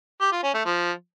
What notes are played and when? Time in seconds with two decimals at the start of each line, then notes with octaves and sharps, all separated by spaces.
0.21 G4
0.32 F4
0.43 C#4
0.54 A3
0.65 F3